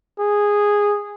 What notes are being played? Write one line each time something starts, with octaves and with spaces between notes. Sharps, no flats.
G#4